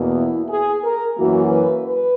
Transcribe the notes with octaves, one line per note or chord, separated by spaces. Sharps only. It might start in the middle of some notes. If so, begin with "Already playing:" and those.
Already playing: E2 B2 A#3
E4
G#4
A#4
F#2 E3 A#3 F#4
B4
B4